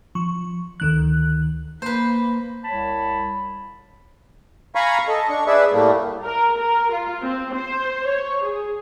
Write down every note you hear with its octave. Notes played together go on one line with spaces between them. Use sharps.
F3 C#6
D2 D#3 F#6
A#3 B4 C5
C2 C#5 A5 B5
F5 G#5 A#5 B5 C#6
A4 D#5
D4 C#6
G#4 B4 D5 E5
A2 G3 A3 A#3
A#4
A#4
F4
C4
C5
C#5
G#4